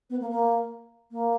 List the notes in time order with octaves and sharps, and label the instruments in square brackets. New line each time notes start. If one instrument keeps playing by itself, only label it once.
[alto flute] B3
A#3
A#3
A#3